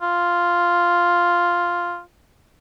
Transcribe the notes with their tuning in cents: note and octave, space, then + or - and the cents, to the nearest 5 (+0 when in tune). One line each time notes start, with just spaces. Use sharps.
F4 +0